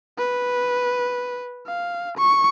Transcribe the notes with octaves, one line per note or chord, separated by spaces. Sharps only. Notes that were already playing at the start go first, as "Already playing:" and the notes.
B4
F5
C#6